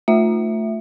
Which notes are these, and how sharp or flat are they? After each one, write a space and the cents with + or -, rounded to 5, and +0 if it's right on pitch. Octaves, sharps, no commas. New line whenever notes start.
A3 +5 F4 +30 E5 +0